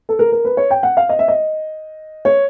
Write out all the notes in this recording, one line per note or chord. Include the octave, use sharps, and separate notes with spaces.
A4
A#4
A#4
B4
C#5
G5
F#5
F5
D#5
E5
D#5
C#5